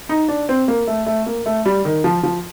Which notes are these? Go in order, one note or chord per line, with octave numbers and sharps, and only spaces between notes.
D#4
D4
C4
A#3
A3
A3
A#3
A3
G3
D#3
F3
F3